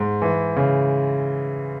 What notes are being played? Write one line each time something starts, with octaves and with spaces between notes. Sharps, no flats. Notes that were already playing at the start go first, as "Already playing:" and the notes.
Already playing: G#2
E3
C#3